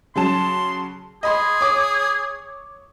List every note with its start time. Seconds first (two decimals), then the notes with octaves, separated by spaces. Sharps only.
0.16 C#3 F#3 A5 C6
1.23 G#4 D#5 B5 C6
1.61 C#5 D6 D#6